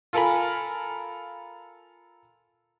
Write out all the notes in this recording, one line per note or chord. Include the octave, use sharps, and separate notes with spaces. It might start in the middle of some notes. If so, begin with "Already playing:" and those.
F4 A4 A#4 G#5 B5